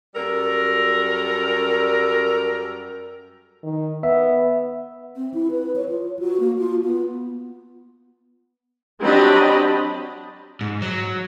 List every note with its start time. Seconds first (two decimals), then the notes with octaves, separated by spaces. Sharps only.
0.15 F#2 G3 A4 A#4
3.63 D#3
4.03 B3 E5
5.17 C4
5.34 E4
5.51 B4
5.76 C#5
5.89 F4
6.19 F#4
6.40 A#3
6.58 F4
6.85 B3
9.01 F#3 C4 D4 G4 D#5 B5
10.61 G#2
10.82 F#3